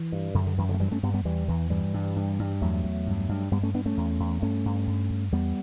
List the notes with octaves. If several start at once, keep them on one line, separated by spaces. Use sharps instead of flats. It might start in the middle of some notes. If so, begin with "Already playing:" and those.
Already playing: E3
G2
F#2 D3
D3
F#2 E3
D3 F#3
A3
G2 E3 G3
A3 C#4
G2 G3 B3
G3 B3
E2 E3 G3
E2 E3
G2 E3 G3
G2
G2
G2
E2 F#3 A3
E2
G2
G2
G2 G3 B3
A3 C#4
G2 B3 D4
A3 C#4
E2
E2
G2 A3 C#4
G2
G2
G2
E2 G3 B3